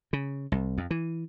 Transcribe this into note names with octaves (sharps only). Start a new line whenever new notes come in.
C#3
C2
F2
E3